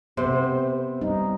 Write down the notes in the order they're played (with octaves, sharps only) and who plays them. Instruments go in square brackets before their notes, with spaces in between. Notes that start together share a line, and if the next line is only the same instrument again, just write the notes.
[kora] C3 [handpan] B3 C4 [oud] C5
[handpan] G3 D#4